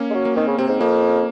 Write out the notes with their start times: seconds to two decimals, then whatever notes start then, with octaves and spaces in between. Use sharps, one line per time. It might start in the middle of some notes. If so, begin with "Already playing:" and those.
Already playing: A#3 C#4
0.10 G#3
0.14 F#3
0.25 A#3
0.36 D#3 C4
0.47 C#3
0.58 C3 C4
0.69 G#2
0.80 F2 A#3